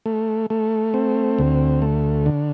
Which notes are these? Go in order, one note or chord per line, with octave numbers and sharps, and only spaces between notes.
A3
A3
C4
D2
A3
D3